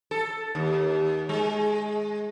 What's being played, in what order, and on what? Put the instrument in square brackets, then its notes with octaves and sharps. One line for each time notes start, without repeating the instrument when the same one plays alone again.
[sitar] A4
D#2
G#3